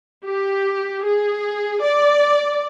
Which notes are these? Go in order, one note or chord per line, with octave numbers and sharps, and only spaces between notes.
G4
G#4
D5